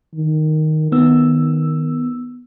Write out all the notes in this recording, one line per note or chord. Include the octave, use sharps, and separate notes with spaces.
D#3
D#3 B3 E6